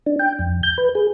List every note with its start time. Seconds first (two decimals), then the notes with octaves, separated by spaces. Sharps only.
0.06 D4
0.19 G5
0.39 F2
0.63 G6
0.78 B4
0.95 G#4